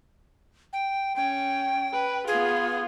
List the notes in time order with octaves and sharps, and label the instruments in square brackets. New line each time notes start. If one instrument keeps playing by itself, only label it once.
[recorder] G5
[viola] C#4 [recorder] G5
[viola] B4
[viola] B3 F4 [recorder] G#4